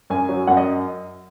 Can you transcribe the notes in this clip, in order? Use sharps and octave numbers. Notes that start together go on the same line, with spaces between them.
F#2 G#5
F#3
F#2 F#5
D#5